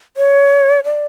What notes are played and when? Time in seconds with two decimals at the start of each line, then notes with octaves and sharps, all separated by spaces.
0.17 C#5
0.84 D5